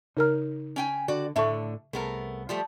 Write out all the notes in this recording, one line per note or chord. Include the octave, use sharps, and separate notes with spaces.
C#3 D#4 A#4 A#5 F6
C#4 G5 G#5
D3 F#4 D5
A2 D3 A3 A4 E5 C#6
C2 A3 B3 G#4 A#4
F3 G3 A3